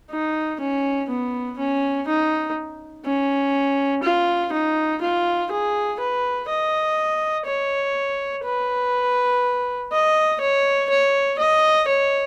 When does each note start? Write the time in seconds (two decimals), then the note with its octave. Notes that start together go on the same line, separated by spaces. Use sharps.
0.11 D#4
0.61 C#4
1.10 B3
1.59 C#4
2.08 D#4
3.06 C#4
4.03 F4
4.53 D#4
5.02 F4
5.51 G#4
6.00 B4
6.49 D#5
7.47 C#5
8.45 B4
9.92 D#5
10.41 C#5
10.90 C#5
11.39 D#5
11.88 C#5